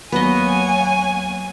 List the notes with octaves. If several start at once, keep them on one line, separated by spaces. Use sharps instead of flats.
D#2 F#3 A#3 B3 C#5 D#5 F#5 G#5